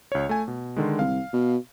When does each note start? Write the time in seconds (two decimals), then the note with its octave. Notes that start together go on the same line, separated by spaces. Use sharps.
0.12 C#2 C#5
0.29 A3 G#5
0.48 B2
0.76 D3 D#3 G#3
0.99 C2 F5
1.33 B2